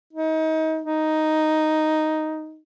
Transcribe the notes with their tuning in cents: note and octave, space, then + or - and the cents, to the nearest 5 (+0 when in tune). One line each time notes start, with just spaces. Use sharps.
D#4 +30
D#4 +0